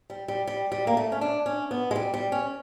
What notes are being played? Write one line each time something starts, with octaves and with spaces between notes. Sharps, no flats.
G3
G3
G3
G3
A#3
A3
C#4
D4
C#4
B3
G#3
G3
G3
C#4